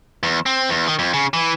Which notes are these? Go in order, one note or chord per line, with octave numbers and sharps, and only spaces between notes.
E2
C4
E2
D#3
F2
C#3
E3